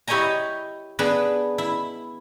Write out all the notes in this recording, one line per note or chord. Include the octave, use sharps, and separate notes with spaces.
E4 G4 C#5 D#5 G#5 A#5
B3 D4 G#4 B4
E4